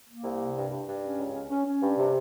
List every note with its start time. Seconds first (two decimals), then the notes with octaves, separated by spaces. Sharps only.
0.08 A#3
0.24 C2
0.39 C3
0.55 G2
0.70 G2
0.87 G2
1.03 C#4
1.18 C#2
1.34 C#4
1.50 C#4
1.66 C#4
1.82 G2
1.98 C3